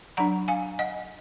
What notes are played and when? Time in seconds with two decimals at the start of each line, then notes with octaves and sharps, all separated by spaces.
0.17 F#3 D4 F#5 A#5
0.48 F5 G#5
0.79 D#5 F#5